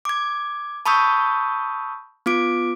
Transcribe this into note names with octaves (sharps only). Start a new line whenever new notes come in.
D6 G#6
A5 B5 C#6 D#6 E6 G6
B3 F4 D6 D7